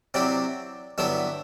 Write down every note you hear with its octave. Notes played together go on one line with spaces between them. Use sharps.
C3 F#3 C4 E4 D5
G2 D3 F#3 B3 E4 E5